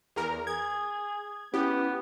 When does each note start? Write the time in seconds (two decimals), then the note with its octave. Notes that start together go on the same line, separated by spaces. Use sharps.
0.16 E2 A#4
0.47 G#4 G#6
1.54 B3 C#4 E4 G4 B4